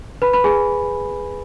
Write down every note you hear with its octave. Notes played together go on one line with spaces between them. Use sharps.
B4 B5
B4 B5
G#4 G#5